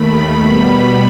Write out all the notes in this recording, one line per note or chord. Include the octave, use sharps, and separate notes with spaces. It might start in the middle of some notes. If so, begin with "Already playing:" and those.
Already playing: D#2 D#3 A3 B5
B2 G3 B3 B5